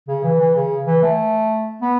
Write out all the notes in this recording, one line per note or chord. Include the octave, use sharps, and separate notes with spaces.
C#3
E3
E3
C#3
E3
A3
B3